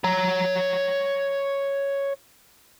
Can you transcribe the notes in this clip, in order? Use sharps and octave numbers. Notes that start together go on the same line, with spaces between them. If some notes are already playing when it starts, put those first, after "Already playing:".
C#5 A#5